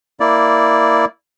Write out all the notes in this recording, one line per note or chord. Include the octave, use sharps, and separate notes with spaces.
A#3 E4 D5